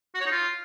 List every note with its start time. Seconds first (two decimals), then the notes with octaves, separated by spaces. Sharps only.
0.15 F#4
0.20 C#5
0.26 D#4
0.31 F4